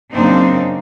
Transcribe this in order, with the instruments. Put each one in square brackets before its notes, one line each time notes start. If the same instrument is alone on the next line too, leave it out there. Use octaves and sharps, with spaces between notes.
[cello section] F#2 C#3 A#3 C4 D4 D#4